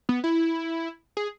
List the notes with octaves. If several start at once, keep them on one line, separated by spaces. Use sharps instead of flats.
B3
E4
G#4